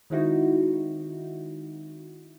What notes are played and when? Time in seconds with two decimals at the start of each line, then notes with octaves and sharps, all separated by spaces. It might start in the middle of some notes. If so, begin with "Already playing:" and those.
0.10 D#3 G#3 C4 D#4 E4 F#4